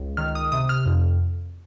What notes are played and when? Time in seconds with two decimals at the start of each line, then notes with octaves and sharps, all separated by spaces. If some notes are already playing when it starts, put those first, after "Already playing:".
Already playing: C#2
0.17 D#3 F6
0.35 D#6
0.52 C3 D#6
0.69 F6
0.86 F2